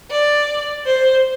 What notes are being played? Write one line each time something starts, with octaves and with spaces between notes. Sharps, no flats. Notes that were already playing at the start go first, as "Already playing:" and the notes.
D5
C5